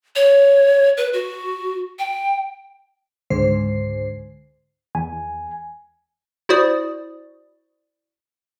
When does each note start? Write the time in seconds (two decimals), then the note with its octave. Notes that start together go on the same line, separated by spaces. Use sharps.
0.16 C#5
0.97 B4
1.13 F#4
1.99 G5
3.30 C#2 G#2 D3 G#3 C5 C7
4.95 E2 G#5
6.49 E4 F#4 C5 D5 D#6